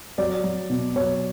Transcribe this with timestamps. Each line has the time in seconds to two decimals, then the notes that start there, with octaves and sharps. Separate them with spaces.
0.18 F#3 D5
0.44 F#3
0.70 B2
0.96 F#3 C#5